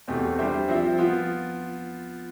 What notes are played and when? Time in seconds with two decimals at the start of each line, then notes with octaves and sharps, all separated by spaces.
0.08 E2 B2 A3 C4 G4
0.39 G3 D4 G4 C5 E5
0.68 F3 C4 F4 C5 E5
0.98 F3 B3 F4